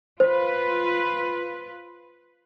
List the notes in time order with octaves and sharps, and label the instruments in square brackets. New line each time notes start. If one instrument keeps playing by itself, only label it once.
[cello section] F4 B4 [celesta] C5